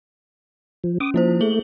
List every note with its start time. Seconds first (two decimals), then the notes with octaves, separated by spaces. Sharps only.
0.84 F3
1.00 C#4 D6 D#6
1.14 F3 A#3 E4 C5
1.41 A3 G#4 F#7 G7